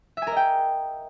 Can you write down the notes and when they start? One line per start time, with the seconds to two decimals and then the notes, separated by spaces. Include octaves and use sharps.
0.17 E5
0.22 G#5
0.27 A#4
0.32 D#5
0.37 G5